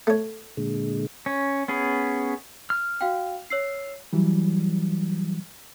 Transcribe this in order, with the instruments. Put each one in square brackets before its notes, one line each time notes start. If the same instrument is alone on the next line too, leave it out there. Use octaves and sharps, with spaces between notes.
[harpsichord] A3 C#5
[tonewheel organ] A#2 D3 G#3
[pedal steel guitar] C#4
B3 C#4 G#4
F6
[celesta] F#4 F5 G5
C#5 E6 C7
[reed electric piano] E3 F#3 G3